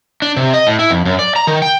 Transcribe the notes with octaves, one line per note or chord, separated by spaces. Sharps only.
D4
C3
D#5
A2
E4
F2
F#2
D5
A#5
D#3
G5